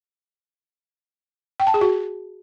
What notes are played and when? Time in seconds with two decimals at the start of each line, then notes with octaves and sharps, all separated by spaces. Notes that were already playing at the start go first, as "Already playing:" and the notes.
1.60 G5
1.67 A5
1.74 G#4
1.81 F#4